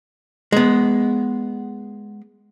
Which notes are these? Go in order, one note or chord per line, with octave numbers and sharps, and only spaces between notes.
G#3 B3